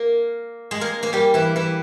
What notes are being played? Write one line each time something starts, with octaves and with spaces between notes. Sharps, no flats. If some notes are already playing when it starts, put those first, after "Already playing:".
Already playing: A#3 A#4
G#3 G#4
A#3 A#4
A#3 A#4
G3 G4
E3 E4
E3 E4